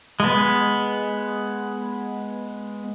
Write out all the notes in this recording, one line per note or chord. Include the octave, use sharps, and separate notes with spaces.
G#3 B3